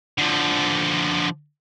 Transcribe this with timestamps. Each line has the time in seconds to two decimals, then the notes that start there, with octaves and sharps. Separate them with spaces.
0.18 D3 F3